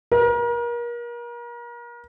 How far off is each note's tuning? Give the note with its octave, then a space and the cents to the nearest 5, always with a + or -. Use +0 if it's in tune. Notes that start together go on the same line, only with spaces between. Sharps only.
A#4 +35